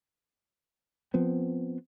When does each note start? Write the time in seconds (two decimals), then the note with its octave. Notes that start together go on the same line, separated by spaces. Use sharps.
1.14 F3 B3 C4